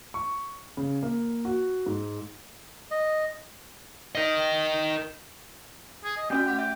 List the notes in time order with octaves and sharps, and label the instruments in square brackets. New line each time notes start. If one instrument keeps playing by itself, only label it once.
[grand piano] C#6
C#3
A#3
F#4
G#2
[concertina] D#5
[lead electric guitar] A#4 D#5
[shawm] G#4
D#5
[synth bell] A3 C#4 F#4 [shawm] G5
[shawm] G4 [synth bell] F#5
[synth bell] E5 [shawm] G5